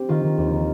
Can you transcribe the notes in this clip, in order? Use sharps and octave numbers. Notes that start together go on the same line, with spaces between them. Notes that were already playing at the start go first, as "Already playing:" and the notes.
Already playing: C4 G4
D#3 F4
D#3
D#2
D#3